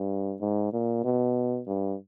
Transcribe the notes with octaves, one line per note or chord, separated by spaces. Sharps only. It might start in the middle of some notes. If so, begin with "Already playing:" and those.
Already playing: G2
G#2
A#2
B2
G2